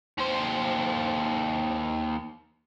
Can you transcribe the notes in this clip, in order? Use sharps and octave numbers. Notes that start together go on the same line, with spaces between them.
D#2 C5